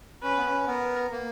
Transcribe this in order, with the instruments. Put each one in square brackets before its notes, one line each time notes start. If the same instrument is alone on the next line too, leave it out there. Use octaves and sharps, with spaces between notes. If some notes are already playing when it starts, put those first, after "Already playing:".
[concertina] C#4 [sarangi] B4
[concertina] B3
C#4
[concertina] B3 [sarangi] A#4
[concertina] A#3